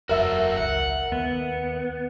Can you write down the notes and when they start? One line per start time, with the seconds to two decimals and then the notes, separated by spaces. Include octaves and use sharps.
0.09 E1 F#2 F#4 A4 A#4 E5 E6
0.57 G#1 C#2 F#5
1.12 D#2 B3